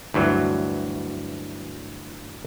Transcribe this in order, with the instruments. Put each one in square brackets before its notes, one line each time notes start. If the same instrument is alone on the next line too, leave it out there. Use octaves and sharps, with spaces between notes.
[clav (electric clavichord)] D2 G2 E3 F#3